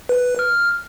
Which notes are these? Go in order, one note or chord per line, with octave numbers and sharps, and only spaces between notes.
B4
F6